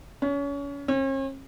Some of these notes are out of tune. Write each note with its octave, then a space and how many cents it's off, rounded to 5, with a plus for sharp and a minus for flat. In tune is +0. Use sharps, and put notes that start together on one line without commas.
C#4 +30
C#4 -45